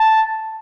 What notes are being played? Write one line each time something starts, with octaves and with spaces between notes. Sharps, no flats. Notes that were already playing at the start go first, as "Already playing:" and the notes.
Already playing: A5